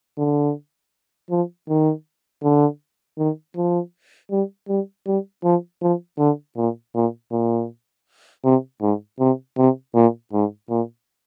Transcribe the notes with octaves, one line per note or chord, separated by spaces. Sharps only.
D3
F3
D#3
D3
D#3
F3
G3
G3
G3
F3
F3
D3
A#2
A#2
A#2
C3
G#2
C3
C3
A#2
G#2
A#2